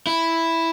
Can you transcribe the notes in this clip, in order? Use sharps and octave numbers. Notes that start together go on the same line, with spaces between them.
E4